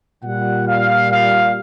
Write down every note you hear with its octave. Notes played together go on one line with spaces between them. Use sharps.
A#2 G3 F#5
F5
F5